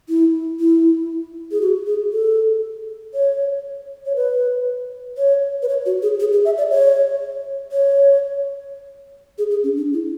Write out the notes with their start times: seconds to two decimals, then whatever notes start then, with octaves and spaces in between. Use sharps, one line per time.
0.09 E4
0.60 E4
1.52 G#4
1.61 F#4
1.86 G#4
2.12 A4
3.14 C#5
4.06 C#5
4.16 B4
5.18 C#5
5.63 B4
5.69 C#5
5.86 F#4
6.02 G#4
6.20 G#4
6.32 G#4
6.45 E5
6.58 D5
6.70 C#5
7.72 C#5
9.38 G#4
9.51 G#4
9.63 C#4
9.77 D4
9.93 E4